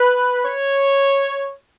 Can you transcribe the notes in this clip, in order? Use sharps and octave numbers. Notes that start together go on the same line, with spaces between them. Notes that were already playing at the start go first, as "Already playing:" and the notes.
Already playing: B4
C#5